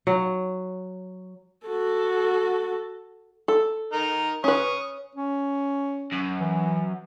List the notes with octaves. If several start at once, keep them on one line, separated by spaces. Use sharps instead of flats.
F#3
F#4 A4
A4
D#4 A#4
C#4 B4 C#6 D#6
C#4
F#2
E3